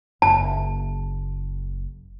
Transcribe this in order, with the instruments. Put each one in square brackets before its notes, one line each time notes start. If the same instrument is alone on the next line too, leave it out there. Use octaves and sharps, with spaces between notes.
[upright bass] F#1 [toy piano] A5